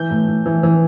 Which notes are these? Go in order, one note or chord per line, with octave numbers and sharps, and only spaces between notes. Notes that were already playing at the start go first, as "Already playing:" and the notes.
Already playing: E3 G6
A2
A2
E3
E3